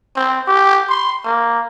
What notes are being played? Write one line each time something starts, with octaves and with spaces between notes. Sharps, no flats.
C4
G4
C6
A#3